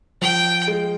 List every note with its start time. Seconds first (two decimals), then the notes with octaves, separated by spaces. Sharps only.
0.21 F3 G5
0.68 G#3